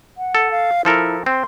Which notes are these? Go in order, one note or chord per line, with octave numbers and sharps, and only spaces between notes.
F#5
A4
F5
F3 E4 A4 A#4
C4 C6